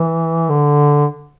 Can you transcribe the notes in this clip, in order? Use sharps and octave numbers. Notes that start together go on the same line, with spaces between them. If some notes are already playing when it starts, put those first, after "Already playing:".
Already playing: E3
D3